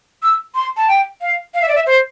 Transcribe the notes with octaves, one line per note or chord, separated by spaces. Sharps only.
E6
C6
A5
G5
F5
F5
E5
D5
E5
C5